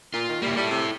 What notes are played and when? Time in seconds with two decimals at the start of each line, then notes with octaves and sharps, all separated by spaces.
0.14 A#2 F4
0.29 D#3
0.42 G3 A#3 E4
0.57 G3 E4 A4
0.70 C3